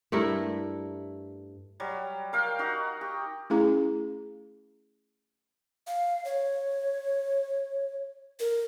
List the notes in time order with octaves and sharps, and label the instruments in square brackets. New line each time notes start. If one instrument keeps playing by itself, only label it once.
[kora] G2 A3 E4 A#4
[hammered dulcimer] F#3 G3
A#4 F5 G5
D#4 F#4
G4
[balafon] A3 C#4 E4 G#4 F5 A#5
[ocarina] F5
C#5
A#4